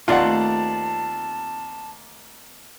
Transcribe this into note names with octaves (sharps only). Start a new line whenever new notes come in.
D#2 A3 C4 F4 D5 F#5 A5